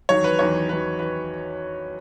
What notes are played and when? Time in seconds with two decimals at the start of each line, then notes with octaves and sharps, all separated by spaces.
0.09 E2 D#3 F#3 C#5
0.24 B4
0.39 E2 D#3 F#3 C#5
0.69 E2 D#3 F#3 B4
0.99 D#3 B4